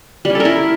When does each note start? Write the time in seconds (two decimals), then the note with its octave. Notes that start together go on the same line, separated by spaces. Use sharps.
0.25 G3
0.30 C#4
0.35 A4
0.40 A#4
0.45 E4